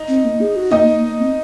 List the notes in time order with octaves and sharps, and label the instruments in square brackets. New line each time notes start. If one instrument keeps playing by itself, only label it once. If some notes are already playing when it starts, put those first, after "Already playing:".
Already playing: [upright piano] D#4
[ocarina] C4
A#3
G#4
F#4
[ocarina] A#3 [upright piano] D#4 D#5
[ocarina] A#3
A#3
C4